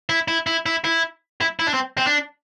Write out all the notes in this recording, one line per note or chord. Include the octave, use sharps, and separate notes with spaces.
E4
E4
E4
E4
E4
E4
E4
D4
C4
C4
D4